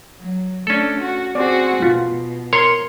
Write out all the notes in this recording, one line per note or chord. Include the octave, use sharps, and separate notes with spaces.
F#3
A3 C#4 D4 A4
F#4
C4 F#4 G#4 D5
B2 F4
A#4 C#5 C6